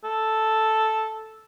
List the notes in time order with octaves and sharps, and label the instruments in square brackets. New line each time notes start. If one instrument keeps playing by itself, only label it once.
[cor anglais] A4